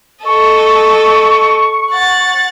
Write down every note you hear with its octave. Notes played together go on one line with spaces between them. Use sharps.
A4 D#5 C#6
F#5 A6